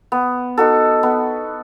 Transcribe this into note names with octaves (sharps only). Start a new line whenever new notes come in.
B3
D#4 F#4 A4
B3